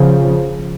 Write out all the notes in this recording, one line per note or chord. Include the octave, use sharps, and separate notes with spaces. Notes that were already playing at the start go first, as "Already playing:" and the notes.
Already playing: C#3 F3